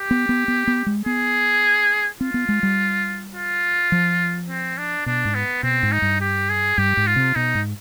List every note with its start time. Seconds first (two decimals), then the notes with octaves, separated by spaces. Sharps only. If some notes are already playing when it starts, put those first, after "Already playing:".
Already playing: G4
0.11 B3
0.29 B3
0.48 B3
0.67 B3
0.86 G#3
1.06 B3 G#4
2.20 C4 F4
2.34 B3
2.49 G#3
2.63 G3
3.35 F4
3.92 F3
4.49 C4
4.78 D4
5.06 B2 D4
5.25 G#2
5.35 B3
5.63 B2 C4
5.83 G#2
5.92 D#4
6.02 G2
6.21 G4
6.49 G#4
6.78 G2 G4
6.97 G#2
7.07 F4
7.16 C3
7.35 B2 D#4
7.55 G#2